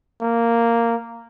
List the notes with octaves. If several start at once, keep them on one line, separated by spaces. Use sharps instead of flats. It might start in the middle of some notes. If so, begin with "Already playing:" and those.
A#3